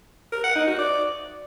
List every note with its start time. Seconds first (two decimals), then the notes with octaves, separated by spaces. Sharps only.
0.32 A#4
0.44 F#5
0.55 D#4
0.67 F#4
0.79 D5